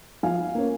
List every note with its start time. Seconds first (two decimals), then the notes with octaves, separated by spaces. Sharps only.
0.23 F3 F5 G#5
0.55 A#3 C#4